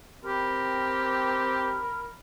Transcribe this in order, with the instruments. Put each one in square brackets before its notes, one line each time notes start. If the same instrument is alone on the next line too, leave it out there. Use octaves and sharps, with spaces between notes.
[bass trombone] C4 [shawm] G4 [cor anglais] A#4 [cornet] B5